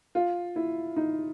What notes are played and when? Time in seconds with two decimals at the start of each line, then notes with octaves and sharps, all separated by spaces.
0.15 F4
0.56 E4
0.96 D#4